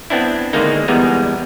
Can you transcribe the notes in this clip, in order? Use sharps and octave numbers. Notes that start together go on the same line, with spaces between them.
B3 C4 D4 E4
D3 D#3 G#3 A#3 D#4
E2 G3 G#3 B3 A#5